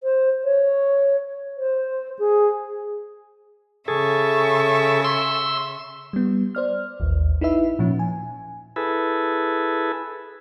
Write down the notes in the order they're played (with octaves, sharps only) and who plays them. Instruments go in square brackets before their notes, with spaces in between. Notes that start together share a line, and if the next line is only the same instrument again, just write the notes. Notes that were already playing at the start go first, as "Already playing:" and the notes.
[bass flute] C5
C#5
C5
G#4
[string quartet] C#3 E5 C#6 [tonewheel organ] G#4 A4
[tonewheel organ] C6 E6
[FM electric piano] G3 B3
C5 D5 F6
A1 D#2
D#4 E4 B4 E5
A#2 F3 C#4
G#5
[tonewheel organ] E4 G#4 A4 B4